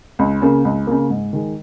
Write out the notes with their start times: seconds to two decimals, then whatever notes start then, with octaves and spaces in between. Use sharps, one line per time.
0.19 C#2
0.42 C#3 A#3
0.65 C#2
0.87 C#3 A#3
1.10 G#2
1.33 D#3 G#3